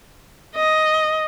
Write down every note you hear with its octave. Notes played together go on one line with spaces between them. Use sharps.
D#5